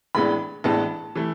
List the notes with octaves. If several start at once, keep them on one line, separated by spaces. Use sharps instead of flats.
A1 A2 G#3 B3 D4 B5
A1 A2 G#3 B3 D4 A5
E3 A3